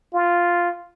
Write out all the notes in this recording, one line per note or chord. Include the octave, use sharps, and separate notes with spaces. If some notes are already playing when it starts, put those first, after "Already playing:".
F4